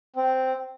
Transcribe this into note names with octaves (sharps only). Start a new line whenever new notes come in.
C4